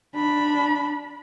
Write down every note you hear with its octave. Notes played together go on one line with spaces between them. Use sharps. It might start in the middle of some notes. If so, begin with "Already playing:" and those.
D4 B5